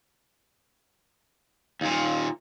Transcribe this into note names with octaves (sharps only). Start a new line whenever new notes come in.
D#2 A#2